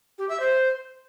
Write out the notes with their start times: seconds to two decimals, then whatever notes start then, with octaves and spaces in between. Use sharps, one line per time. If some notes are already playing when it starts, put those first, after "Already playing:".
0.18 G4
0.29 E5
0.40 C5